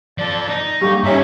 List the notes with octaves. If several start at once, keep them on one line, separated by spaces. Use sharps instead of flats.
F3 A4 D5
D#4
D3 G3 A#3 G4 C#6
G2 D3 C#4 D#4 C#5 E5